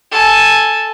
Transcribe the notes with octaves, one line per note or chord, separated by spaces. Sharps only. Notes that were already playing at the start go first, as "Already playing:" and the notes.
A4 G#5